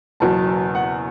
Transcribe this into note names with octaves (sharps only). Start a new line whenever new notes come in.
F#1 E2 B2 F#3 A5
F#5